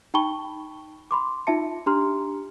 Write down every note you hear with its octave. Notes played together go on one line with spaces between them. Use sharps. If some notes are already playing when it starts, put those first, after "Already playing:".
D#4 G5 A5 B5 C#6 G7
B5 C6 D6
D#4 F4 E5 A5 C#7
D4 G4 A#5 C6 F6